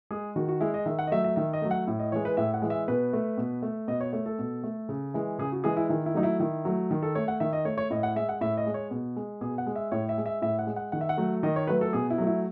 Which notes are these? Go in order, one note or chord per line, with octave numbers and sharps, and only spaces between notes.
G#3 G#4
D#3 F#4
F#4
G#3 E4
D#5
D#3 E5
F#5
D#5
F#3 A3 E5
E5
D#3 E5
D#5
F#3 A3
F#5
A2
D#5
E3 G#3 C#5
B4
A2 E5
F#5
E3 G#3
E5
B2 B4
A3
B2
A3
B2 D#5
C#5
A3 C#5
A4
B2
A3
C#3
E3 G#3
C#3 G#4
F#4
E3 G#3 G#4
E4
D#3 E4
E4
F#3 A3 D#4
E4
D#3 E4
F#3 A3
D#3
A4
A3 C#5
F#5
D#3 E5
D#5
A3 C#5
C#5
A2 D#5
F#5
G#3 E5
F#5
A2 E5
D#5
G#3
C#5
B2
G#3
B2 G#4
F#5
G#3
E5
A2 C#5
E5
G#3
E5
A2 E5
F#5
G#3
F#5
D#3 F#5
E5
F#5
F#3 A3
D#3 D#5
C#5
F#3 A3 B4
A4
B2 G#4
E4
F#3 A3
E4